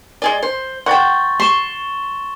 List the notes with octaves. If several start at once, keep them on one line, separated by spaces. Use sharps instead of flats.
G#3 G#4 D5 G7
C5
F#5 G5 C6 C#6 A6
C6 C#6 E7 G7